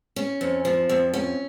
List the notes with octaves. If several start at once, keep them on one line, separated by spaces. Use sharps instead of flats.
C#4
F2
F3
F2
C#4